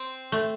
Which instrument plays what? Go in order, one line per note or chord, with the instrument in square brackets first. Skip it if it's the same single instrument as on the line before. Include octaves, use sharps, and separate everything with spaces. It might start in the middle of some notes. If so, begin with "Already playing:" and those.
Already playing: [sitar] C4
[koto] A3